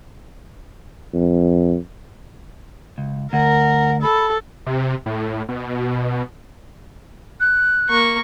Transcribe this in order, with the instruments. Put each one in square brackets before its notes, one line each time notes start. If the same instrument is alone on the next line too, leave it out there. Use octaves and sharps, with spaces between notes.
[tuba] F2
[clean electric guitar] C#2
[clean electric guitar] D2 [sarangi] A#4 [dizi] F#5
[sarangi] A4 [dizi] B5
[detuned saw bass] C3
A2
B2
[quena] F#6
[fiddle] A#3 C#6